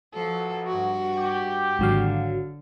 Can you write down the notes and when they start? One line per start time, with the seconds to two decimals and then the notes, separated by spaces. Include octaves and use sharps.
0.14 B1 F3 F#3 A4
0.67 G2 F#4
1.16 G4
1.79 G#1 D3 F#3 F5